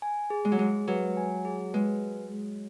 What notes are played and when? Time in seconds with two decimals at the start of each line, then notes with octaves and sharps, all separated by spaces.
0.02 G#5
0.30 G#4
0.45 G#3
0.52 F#3
0.59 G#3 G#4
0.87 F#3 B4
1.17 G#5
1.45 G#4
1.74 G#3 B4